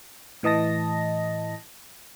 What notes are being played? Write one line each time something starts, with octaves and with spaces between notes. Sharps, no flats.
A2 E3 D#5 A5 A#6